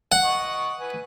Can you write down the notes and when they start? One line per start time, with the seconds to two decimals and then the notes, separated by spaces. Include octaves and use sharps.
0.12 F#5
0.24 D#5 C#6 D#6
0.79 B4 G#5